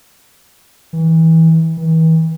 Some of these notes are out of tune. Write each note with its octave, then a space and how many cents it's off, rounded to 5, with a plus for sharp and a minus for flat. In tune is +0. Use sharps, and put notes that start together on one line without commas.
E3 -25
E3 -40